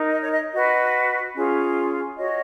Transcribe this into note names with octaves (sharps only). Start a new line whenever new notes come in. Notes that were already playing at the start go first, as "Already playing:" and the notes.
Already playing: D#4 A#4
D#5
C#5
D#5
F#4 B4 D#5
C#4 F4 G#4
F#4 C#5 D#5